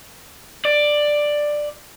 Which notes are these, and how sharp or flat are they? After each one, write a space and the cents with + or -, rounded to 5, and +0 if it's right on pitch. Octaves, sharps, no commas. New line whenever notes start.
D5 +10